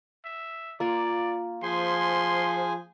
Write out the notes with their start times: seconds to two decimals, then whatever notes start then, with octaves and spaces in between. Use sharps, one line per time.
0.24 E5
0.80 A#3 F4 D5
1.63 F3 G#4 C5 G#5 C6